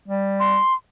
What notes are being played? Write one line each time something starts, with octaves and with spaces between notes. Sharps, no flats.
G3
C6